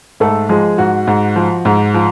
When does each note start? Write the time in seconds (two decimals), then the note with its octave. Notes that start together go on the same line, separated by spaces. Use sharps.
0.20 G#2 A3 A4
0.49 F3 G#3 G#4
0.78 G#2 F#4
1.07 G#2
1.36 F3
1.65 G#2
1.94 F3